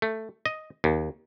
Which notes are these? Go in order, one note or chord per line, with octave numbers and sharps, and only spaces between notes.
A3
D#5
D#2